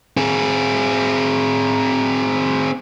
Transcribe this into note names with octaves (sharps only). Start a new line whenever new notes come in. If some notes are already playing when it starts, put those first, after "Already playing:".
C4 G#4